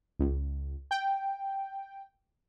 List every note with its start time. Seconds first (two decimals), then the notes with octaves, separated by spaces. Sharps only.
0.19 C#2
0.91 G5